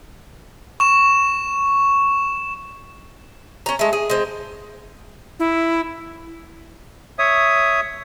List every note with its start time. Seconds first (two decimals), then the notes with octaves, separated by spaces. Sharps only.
0.80 C#6 E7
3.66 C#4 A#5
3.79 G#3 A3
3.93 G#4
4.10 G#3 C4
5.39 E4
7.19 C#5 E5 D#6